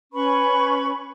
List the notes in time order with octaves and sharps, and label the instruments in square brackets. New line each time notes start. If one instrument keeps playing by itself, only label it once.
[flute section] C#4 B4 B5 C#6